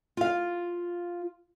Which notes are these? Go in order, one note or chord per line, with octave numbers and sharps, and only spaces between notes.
F4 F5